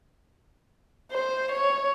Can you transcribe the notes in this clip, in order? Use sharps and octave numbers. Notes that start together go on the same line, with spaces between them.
C5
C#5